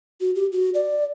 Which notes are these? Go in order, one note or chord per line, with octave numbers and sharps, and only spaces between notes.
F#4
G4
F#4
D5